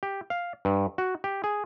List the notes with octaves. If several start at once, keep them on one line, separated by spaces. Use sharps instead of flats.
G4
F5
G2
F#4
G4
G#4